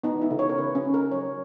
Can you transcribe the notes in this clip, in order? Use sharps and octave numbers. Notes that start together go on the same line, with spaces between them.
B3 D#4
E4
C#3
C#5
A#4
C#3 B4
C#4
C#3
A#4
F#3 C#5